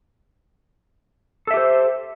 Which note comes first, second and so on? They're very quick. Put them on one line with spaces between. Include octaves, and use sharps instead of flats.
A4 E5 G4 C5